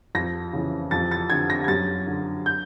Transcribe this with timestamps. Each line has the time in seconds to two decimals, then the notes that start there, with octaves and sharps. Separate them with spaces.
0.15 F2 A#6
0.53 C#3 E3
0.91 F2 A6
1.11 A6
1.30 D3 G#6
1.50 A#6
1.64 G#6
1.68 F#2 A6
2.07 D3
2.46 G6